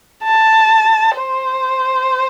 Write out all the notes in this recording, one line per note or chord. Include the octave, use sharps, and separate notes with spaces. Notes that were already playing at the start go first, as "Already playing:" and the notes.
A5
C5